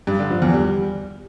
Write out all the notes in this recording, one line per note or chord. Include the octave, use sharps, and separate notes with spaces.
G2
D3
F3
E2
G3